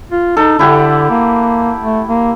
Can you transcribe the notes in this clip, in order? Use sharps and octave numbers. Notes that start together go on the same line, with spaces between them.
F4
D#4 A4
D3 E4 G4 F#5
A#3
A3
A#3